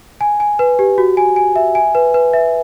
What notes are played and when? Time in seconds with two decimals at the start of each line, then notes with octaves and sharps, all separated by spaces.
0.21 G#5
0.40 G#5
0.59 B4
0.79 G4
0.98 F#4
1.17 G#5
1.36 G#5
1.56 E5
1.75 G#5
1.95 B4
2.14 B4
2.33 E5